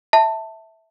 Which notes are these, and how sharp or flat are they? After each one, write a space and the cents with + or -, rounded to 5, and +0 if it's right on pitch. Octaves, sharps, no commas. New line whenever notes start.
E5 -10 A5 +15